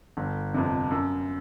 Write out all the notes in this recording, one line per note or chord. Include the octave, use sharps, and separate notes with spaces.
G1
F2 C3
F#2